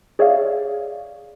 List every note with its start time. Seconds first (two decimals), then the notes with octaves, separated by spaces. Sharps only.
0.19 G#4 C#5 D5 E5 F5